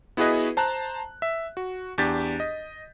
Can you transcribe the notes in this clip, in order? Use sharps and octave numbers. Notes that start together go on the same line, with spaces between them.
B3 E4 F#4 G#4 B4 D#5
C5 A5 A#5 F#6
E5
F#4
E2 D4 G4 G6 A6 B6
D#5